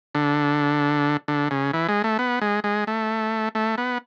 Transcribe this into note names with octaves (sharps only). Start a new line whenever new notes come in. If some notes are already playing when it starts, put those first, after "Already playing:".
D3
D3
C#3
E3
G#3
A3
B3
G#3
G#3
A3
A3
B3